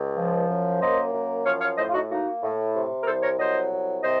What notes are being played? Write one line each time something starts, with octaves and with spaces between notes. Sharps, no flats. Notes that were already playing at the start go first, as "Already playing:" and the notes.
Already playing: C#2
F3
F#2
A#3 C5 D#5
F#2
F3 C#5 F5
C#5 F5
A2 C5 D#5
F4
D#4 F#4
A#3 D#4 F#4
A2
C3
A#4
C2 A4 C5
A#4 C#5
F#3 C5 D#5
C2
C3 C5 D#5